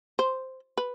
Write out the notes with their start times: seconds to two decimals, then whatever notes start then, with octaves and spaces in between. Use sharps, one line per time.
0.19 C5
0.77 B4